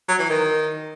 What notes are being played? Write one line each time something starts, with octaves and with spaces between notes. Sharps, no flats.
F#3
E3
D#3